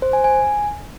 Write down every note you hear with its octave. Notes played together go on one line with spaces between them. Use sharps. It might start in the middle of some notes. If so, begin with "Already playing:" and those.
C5
G#5
G#5